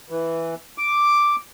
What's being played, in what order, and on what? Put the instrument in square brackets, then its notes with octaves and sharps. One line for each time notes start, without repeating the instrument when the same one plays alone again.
[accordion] E3
D6